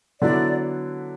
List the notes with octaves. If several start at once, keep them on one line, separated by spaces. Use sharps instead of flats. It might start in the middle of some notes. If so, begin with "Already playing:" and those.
D3 F#3 B3 E4 D5